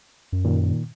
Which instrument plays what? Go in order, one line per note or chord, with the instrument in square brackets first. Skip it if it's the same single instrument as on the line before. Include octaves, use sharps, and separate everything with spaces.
[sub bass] F#2
[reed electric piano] A#2 D#3